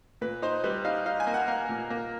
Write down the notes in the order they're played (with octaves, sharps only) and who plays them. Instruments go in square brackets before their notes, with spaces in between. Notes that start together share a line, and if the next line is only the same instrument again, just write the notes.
[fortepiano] A#2 B4
D#4 C5
G3 B4
D#4 F5
D#4 F5
G#5
A#3
F#5
A#3 F5
A#2
A#3